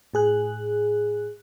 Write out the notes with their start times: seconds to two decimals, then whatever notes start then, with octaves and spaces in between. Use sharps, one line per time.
0.14 A2 G#4 F#6